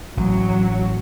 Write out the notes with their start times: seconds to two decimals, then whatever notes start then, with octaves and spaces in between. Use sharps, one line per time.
0.17 A1 F#3